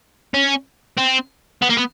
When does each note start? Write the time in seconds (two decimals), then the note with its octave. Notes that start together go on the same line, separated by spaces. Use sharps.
0.34 C#4
0.97 C4
1.62 B3
1.70 A#3
1.78 B3